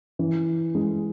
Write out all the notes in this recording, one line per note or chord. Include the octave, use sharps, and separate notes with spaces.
E3
G#3